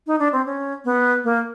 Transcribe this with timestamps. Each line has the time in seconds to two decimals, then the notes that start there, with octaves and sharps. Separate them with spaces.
0.07 D#4
0.19 D4
0.33 C4
0.46 C#4
0.85 B3
1.24 A#3